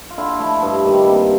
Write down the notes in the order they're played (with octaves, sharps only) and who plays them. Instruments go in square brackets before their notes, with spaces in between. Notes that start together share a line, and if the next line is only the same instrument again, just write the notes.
[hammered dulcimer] F4
D3 E4
F3 A3 E4
G2 E4
D#3 G3 A#3
C3